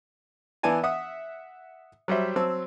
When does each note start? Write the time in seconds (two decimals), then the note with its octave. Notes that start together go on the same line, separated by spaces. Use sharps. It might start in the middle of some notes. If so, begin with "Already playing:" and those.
0.63 E3 B3 E4 D5 G#5 A5
0.84 E5 F#5 D#6
2.08 F#3 G3 C5 E5
2.36 F#3 C4 A5 E6